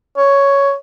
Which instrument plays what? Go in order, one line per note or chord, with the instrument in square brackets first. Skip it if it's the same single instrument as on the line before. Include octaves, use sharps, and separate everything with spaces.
[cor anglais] C#5